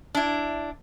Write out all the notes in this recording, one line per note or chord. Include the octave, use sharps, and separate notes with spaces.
D4 E4